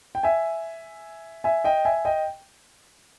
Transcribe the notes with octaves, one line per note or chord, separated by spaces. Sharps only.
G5
E5 G#5
E5 G#5
D#5 G5
E5 G#5
D#5 G5